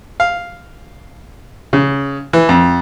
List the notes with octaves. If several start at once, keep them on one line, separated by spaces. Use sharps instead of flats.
F5
C#3
E3
F2